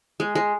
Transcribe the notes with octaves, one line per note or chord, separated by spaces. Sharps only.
G#3
G#3